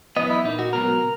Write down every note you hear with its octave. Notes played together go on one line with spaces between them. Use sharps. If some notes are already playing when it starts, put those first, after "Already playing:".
F#2 E3 B3 D#5
E4
A#2 A#3 D#4
F#4
C#2 B2 F#3 B3 A#4